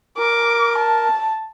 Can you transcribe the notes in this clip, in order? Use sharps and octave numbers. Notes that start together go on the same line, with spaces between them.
A#4 D6
A5